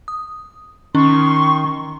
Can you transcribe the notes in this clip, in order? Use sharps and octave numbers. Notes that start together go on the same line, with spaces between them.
D#6
D#3 C#4 C6 C#6